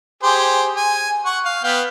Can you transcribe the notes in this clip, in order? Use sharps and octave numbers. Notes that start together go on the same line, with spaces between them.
G4 G#4 C5
G#5
F#5 C#6
F5
B3 F5 G5